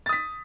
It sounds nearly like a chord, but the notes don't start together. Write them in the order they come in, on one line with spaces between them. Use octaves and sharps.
A6 D#6 B6